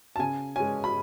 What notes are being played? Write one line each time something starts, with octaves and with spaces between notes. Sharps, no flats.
A5
C#3 G#5
G#3 C#4 G#5
B5